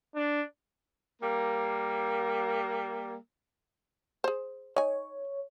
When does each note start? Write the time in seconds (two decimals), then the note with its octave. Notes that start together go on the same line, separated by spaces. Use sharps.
0.15 D4
1.21 G3 A#3
4.24 G#4 C5
4.76 D#4 C#5 G#5